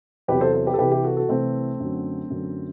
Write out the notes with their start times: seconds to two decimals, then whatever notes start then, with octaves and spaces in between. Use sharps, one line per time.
0.28 E2 C3 F#3 G4 B4
0.41 A4 C5
0.53 A4 C5
0.67 G4 B4
0.74 A4
0.79 C2 C3 E3 G4 B4
0.91 E4 G4
1.04 F#4 A4
1.17 F#4 A4
1.29 C2 C3 E3 A3 C4
1.80 F#2 D3 F#3
2.30 F#2 D3 F#3